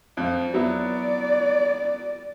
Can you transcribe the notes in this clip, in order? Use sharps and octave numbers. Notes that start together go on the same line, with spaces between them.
F2 F3
F#3 B3 E4 D5